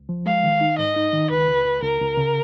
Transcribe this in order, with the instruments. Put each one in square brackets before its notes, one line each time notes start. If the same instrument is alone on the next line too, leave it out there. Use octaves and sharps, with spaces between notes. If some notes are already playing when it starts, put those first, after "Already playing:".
Already playing: [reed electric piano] C#2
F3
[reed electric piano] G#3 [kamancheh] F5
[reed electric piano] D#3
D#4
[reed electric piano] G#2 [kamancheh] D#5
[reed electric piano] D#4
D#3
[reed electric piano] C#2 [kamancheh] B4
[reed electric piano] C#2
C#2
[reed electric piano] C#2 [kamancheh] A#4
[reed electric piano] C#2
C#3